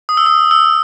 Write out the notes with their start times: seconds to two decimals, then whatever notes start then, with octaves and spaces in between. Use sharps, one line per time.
0.09 D#6
0.17 E6
0.26 D#6
0.51 E6